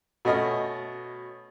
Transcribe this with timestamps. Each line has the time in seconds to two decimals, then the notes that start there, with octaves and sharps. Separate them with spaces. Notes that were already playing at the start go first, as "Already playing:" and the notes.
0.25 B2 A3 C#4 D#5 F6